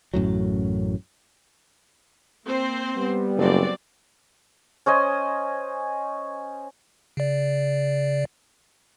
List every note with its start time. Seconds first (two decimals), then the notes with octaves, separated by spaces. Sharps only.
0.14 A1 F#2 A2 F#3
2.45 A#3 C4 C5
2.97 G3 B3
3.37 F#1 F#3 C4 D5
4.86 C#4 C5 D#5 G#5
7.17 C#3 D5